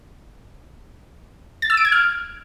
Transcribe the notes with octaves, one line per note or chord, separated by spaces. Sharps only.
A6
E6
D7
G#6
F6